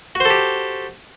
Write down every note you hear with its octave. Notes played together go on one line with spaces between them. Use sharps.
F#4 G4 A4 C5